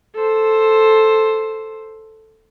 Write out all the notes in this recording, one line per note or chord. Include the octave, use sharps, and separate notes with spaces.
A4 C5